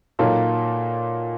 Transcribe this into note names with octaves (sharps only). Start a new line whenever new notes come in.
A#2 F#3 A#3 D#4 A4